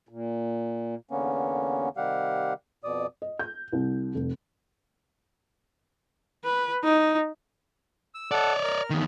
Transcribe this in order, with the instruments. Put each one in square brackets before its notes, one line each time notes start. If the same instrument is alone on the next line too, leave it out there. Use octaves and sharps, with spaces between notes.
[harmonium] A#2
[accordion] E2 D3 A#3 B3 C#4
C3 D#3 G3 G4 F5 F#5
F2 B2 D5 D#6
[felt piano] D#5
G6
C2
F1
[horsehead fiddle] B4
D#4
[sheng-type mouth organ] E6
[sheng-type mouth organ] A4 F#5 [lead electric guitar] C#5 D5
[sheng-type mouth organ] A#4 F6
[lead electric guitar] E2 D#3